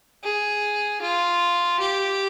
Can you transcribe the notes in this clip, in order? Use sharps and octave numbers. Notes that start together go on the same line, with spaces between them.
G#4
F4
G4